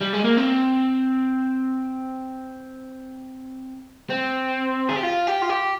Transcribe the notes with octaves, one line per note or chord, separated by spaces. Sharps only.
G3
G#3
A#3
C4
C4
G#4
G4
F4
G4
F4
G4